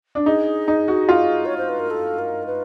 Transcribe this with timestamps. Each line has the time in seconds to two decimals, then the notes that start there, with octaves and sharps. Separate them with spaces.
0.15 D4
0.26 D#4 G#4
0.68 D#4
0.88 F#4
1.09 F4
1.45 C#5
1.58 C5
1.69 B4
1.80 A#4
1.91 A4
2.19 A#4
2.46 B4